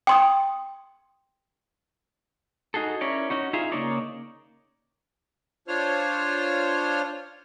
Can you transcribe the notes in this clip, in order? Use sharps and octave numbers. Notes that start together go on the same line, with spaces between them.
G5 C6 D#6
D#4 F#4 G#4 A4
C#4 E4 A#4 C#5 D5
C#4 D#4 F#4
D#4 F4 G#4 E5 F5
C#3 A#3 D#4 A#4 C#5 D5
D4 F4 C5 C#5 F6